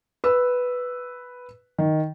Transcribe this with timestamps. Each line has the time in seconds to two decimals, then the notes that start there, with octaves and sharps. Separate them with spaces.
0.24 B4 E6
1.78 D#3